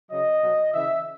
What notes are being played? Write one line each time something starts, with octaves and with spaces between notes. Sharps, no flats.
C#3 F#3 D#5
B2 F#3
C#3 E3 E5